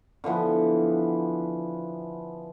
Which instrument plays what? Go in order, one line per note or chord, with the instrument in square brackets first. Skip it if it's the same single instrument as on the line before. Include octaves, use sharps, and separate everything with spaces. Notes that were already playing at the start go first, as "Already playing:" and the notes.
[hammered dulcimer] D3 E3 F3 B3